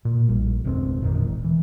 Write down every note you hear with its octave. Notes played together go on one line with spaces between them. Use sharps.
A#2
A#1 G3
D1 F2 B2 C4
G#1 A#2 D3 D#3
E1
E3